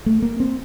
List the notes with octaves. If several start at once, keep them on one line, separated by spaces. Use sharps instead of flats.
A3
A#3
C4